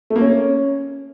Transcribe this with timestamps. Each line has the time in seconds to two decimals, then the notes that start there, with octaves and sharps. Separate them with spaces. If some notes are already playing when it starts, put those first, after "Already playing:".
0.10 A3
0.16 A#3
0.21 C#4